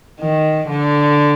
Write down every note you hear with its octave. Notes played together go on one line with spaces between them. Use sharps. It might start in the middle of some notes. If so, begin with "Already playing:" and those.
D#3
D3